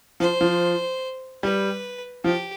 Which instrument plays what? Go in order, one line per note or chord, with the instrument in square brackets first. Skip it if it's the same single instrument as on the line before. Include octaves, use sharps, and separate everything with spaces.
[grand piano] F3 [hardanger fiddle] C5
[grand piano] F3
[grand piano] G3 [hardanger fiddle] B4
[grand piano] F3 [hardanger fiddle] G4